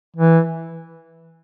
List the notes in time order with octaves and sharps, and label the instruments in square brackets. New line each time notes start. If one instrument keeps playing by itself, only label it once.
[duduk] E3